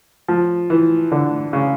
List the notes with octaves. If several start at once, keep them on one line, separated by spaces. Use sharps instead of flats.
F3
E3
D3
C#3